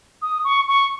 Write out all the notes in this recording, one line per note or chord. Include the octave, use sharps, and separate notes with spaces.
D#6
C#6
C#6